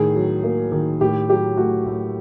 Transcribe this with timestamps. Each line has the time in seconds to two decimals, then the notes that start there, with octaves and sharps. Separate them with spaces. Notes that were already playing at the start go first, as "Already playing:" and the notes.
Already playing: A2 D#3 G#4
0.15 F#3
0.44 A#3
0.72 D#3
1.01 A2 G4
1.29 F#3 G4
1.57 A3 F#4
1.86 A2